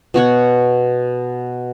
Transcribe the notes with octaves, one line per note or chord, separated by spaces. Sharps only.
B2 F#4 C#5 F#5